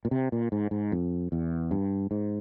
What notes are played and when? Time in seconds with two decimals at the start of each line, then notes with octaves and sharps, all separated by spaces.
0.05 A#2
0.11 C3
0.32 A#2
0.52 G#2
0.71 G#2
0.92 F2
1.32 E2
1.71 G2
2.11 G#2